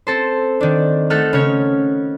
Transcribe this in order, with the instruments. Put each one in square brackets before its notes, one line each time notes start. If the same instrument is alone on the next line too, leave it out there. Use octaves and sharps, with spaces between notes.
[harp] C4 A4 C5
D#3 D4
A3 D#4 A4 F#5 F6
C#3 C#4 C#5 G#6